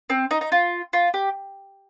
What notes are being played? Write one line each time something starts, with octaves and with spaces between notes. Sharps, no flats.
C4
D#4
D#4
F4
F4
G4